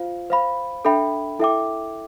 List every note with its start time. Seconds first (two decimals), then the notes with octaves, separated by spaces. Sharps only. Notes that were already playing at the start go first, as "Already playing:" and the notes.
Already playing: F4 C5 F5
0.30 C5 F5 B5
0.85 D4 A4 E5 G5 B5
1.39 E4 A4 E5 G5 D6